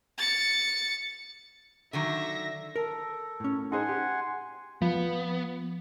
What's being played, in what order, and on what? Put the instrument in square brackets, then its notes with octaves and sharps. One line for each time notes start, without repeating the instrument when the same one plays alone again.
[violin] A6 C#7
[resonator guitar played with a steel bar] D3 D#3 F#3 [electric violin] E5 A#6
[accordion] A4 [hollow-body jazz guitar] A#4
[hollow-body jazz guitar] A2 C#4
[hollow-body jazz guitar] D#4 G#4 C5 [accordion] F#5 G#5 C6
[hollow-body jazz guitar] G4
[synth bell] F3 [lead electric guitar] B3